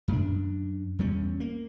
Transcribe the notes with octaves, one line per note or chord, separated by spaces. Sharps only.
F#2 C4 D4
E2 G3 C#4
A#3